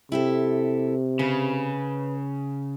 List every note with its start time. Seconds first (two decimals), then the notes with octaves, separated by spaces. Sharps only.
0.12 C3 E4 G4 A4
1.19 C#3 B4